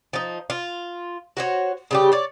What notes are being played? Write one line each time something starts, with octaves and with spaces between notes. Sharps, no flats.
F3 D#4
F4
F#4 C5 C#5
C#3 G3 G4
C#5 D5